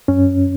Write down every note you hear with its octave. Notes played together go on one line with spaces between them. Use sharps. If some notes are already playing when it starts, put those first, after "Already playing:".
F#2 C#4